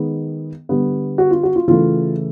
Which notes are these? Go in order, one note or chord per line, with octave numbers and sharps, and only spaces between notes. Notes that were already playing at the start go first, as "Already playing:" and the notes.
Already playing: D#3 G#3 B3
D3 G3 B3
F#4
F4
F#4
F4
C#3 E3 A3 F4